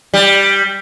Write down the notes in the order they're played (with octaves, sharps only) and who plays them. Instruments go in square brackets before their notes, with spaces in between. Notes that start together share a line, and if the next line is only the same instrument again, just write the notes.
[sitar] G3